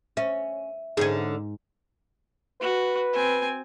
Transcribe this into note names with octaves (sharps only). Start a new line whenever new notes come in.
C#4 E5
G#2 D3 C#4 G#4 G#5
F#4 B4
C4 G#5